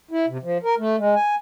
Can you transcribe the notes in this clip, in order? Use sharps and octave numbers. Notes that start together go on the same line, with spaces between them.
E4
C3
F3
A#4
A3
G#3
G#5